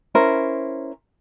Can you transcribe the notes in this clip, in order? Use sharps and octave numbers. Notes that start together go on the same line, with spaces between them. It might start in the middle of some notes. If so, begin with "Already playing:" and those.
C#4 E4 A#4 C5